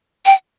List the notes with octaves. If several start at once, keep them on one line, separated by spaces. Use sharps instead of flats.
G5